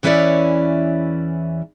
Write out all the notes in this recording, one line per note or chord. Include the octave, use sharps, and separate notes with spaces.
E2 E3 C#4 E4 C#5 D5